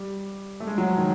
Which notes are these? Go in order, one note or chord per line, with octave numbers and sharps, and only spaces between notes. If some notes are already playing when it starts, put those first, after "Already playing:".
Already playing: G3
A3
G#3
F#3
F3
D#3